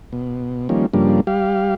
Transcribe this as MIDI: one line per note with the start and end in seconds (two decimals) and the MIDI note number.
0.12 0.68 47
0.69 0.86 51
0.69 0.86 53
0.69 0.86 55
0.69 0.86 58
0.69 0.86 61
0.94 1.21 43
0.94 1.21 49
0.94 1.21 53
0.94 1.21 55
0.94 1.21 58
0.94 1.21 62
1.27 1.75 55
1.27 1.75 67
1.27 1.75 77